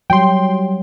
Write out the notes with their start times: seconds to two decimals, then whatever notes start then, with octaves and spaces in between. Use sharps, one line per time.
0.10 F#3 G3 G5 C6